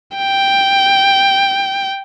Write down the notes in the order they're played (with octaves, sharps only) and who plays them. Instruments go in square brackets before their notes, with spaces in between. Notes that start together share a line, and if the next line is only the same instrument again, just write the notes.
[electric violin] G5